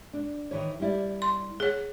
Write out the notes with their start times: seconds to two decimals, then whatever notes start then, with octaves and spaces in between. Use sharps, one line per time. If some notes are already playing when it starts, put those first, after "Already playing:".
0.13 D4
0.51 D#3 E3 C#5
0.80 G3 E4 D5
1.22 C6
1.60 G#4 C#5 F#5